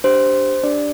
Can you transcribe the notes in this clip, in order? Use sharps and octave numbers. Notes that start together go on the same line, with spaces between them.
D4 G4 C5
D4 G4 D5